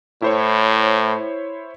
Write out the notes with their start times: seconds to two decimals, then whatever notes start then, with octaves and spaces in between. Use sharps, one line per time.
0.22 A2 E4 C5 C#5